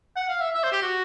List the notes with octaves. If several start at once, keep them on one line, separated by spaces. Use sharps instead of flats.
F#5
F5
E5
E5
C5
G4
F#4